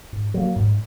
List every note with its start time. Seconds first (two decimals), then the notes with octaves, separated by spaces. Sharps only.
0.13 G#2
0.34 F#3 A#3
0.56 G#2